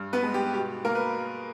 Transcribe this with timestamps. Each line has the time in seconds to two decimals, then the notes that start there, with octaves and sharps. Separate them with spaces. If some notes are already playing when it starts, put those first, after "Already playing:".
Already playing: G2
0.13 B3 B4
0.23 G#3
0.34 G4
0.54 B2 G4
0.85 B2 A#3 A#4
0.95 B4